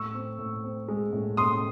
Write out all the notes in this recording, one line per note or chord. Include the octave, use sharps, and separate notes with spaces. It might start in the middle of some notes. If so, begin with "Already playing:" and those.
Already playing: A2 C#6 E6
C4
A2
C4
G#3
A2
A2 C6 D#6